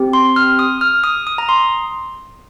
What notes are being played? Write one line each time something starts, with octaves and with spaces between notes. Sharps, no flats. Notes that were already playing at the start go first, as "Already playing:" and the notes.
Already playing: C4 G4
C6
F6
D#6
F6
D#6
D#6
A#5
C6